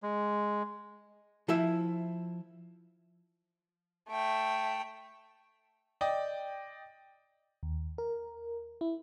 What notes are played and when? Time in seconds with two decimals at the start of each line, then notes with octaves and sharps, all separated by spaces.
0.03 G#3
1.48 F3 E4 E5
4.09 A3 G5
6.01 D5 D#5 G5
7.63 D#2
7.98 A#4
8.81 E4